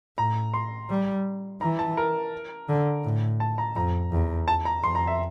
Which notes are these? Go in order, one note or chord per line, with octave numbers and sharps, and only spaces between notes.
A2 A#5
C6
G3
E3 A#5
A5
A#4
D3
A2
A5
A#5
F2 A#5
E2
A5
A#5
F2 C6
A#5
E5